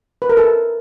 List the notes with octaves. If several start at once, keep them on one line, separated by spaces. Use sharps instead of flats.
B4
A#4
A4